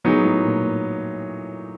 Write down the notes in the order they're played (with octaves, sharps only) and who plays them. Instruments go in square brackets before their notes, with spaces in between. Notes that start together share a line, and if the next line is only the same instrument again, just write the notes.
[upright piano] A2 [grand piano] F#3 B3 D#4 G#4
[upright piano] A2
A#2
A#2